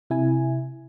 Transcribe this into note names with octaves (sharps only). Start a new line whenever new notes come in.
C3 E4 G#5